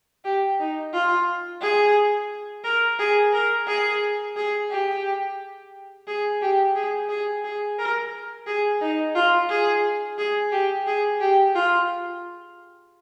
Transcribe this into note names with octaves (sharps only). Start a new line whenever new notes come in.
G4
D#4
F4
G#4
A#4
G#4
A#4
G#4
G#4
G4
G#4
G4
G#4
G#4
G#4
A#4
G#4
D#4
F4
G#4
G#4
G4
G#4
G4
F4